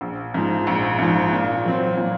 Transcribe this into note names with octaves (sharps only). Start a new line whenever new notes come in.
A#1
G#2 F3
A#1
G#2 F3
A#2
F#3 C4
A#2